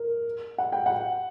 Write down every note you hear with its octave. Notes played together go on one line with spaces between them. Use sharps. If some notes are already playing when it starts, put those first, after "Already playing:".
Already playing: A#4
F#5
G5
F#5